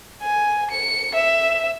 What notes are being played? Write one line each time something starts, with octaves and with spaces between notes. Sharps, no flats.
G#5
C#7
E5